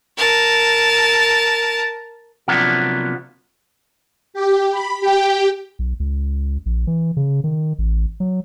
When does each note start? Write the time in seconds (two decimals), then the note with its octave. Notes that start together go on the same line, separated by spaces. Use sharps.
0.17 A#4 A5
2.48 C3 F3 F#3 A#3 B3 D4
4.34 G4
4.72 B5
5.01 G4 G5
5.79 B1
6.00 C#2
6.66 A#1
6.87 E3
7.17 C#3
7.44 D#3
7.79 A1
8.20 F#3